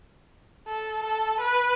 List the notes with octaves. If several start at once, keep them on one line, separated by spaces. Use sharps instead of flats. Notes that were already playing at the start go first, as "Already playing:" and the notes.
A4
A4
B4